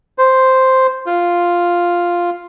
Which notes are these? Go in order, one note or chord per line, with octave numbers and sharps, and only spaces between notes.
C5
F4